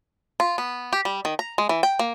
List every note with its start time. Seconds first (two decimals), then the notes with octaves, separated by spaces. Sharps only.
0.40 F4
0.58 B3
0.93 G4
1.05 G3
1.25 D#3
1.39 A#5
1.58 G#3
1.69 E3
1.83 G5
1.99 A#3